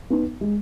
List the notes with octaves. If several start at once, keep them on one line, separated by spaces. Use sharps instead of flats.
B3 D#4
G#3